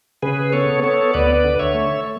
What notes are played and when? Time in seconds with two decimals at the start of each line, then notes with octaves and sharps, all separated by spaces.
0.22 C#3 G#4 B4
0.53 B3 A4 C#5
0.83 B3 A4 C#5
1.14 D2 B4 D5
1.44 D3
1.59 C#5 E5
1.74 A3